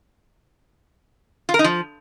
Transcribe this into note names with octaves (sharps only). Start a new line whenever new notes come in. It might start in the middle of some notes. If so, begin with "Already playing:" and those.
F4
A#4
D#4
F3